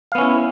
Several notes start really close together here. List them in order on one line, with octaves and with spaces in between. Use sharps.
F5 B3 C#4 E4